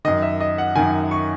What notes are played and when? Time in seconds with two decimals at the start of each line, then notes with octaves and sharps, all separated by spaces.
0.05 F#2 D#3 D#5
0.22 E5
0.40 D#5
0.58 F#5
0.75 F#2 D#3 G#5
1.11 C#6